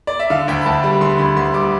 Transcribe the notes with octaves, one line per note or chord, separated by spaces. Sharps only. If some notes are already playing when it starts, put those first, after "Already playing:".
D5
E5
D3 F5
D2 G5
B5
D2 A5
G3 B5
D3 C6
D2 B5
D2 C6
G3 D6